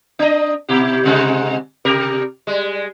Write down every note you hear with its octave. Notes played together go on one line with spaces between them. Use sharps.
D4 D#5
B2 E4 G4
G#2 C3 G#3
C3 G4 A#4
G3 G#3